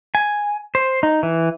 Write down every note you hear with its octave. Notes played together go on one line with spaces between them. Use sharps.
G#5
C5
D#4
E3